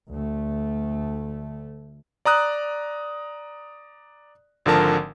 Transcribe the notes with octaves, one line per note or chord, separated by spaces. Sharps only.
D2 A3
D5 A#5 D#6 F#6
G#1 D3 F3 A#4 A5